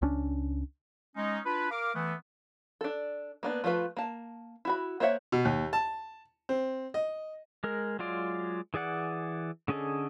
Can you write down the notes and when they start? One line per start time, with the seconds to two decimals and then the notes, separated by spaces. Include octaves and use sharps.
0.02 C#2 C#4 D4
1.16 G#3 C#4 D#4
1.45 D4 E4 F4 B4
1.70 A#4 F5 D6
1.94 E3 A3 B3
2.81 D4 A4
3.43 A#3 B3 D4
3.64 F3 A3 E4 F4 B4
3.97 A#3 A5
4.65 E4 F#4 B5
5.00 A#3 C5 C#5 E5 F#5
5.32 B2
5.45 D#2
5.73 A5
6.49 C4
6.94 D#5
7.64 G#3 A#4
7.99 F#3 G#3 F4 D5
8.74 E3 G#4 D5 F#5
9.68 D3 C#4 G#4 A4 D#5